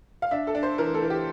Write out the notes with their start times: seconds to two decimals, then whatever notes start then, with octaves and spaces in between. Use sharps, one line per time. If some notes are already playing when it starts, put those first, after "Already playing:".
0.22 F5
0.31 D4 E5
0.47 A4
0.55 D4
0.63 C5
0.78 E3 A#4
0.94 A4
1.02 E3
1.10 G4